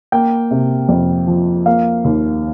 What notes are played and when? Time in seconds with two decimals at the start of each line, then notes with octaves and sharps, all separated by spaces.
0.12 A#3 G5
0.51 C3
0.89 F2
1.27 F3
1.66 A#3 F5
2.05 D#2